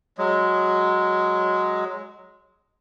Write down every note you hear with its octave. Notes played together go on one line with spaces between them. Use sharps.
F#3 G#3